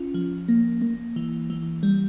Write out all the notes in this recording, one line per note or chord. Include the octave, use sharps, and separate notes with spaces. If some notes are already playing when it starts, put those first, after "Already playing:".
Already playing: C#4 F4
F3
A#3
A#3
E3
E3
G3